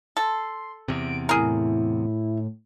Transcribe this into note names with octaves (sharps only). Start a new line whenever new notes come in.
A4 C6
E2 C3 D7
A2 E4 G#4 A#4